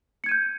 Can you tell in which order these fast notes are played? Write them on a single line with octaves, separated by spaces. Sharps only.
C#7 G#6 D#7 G6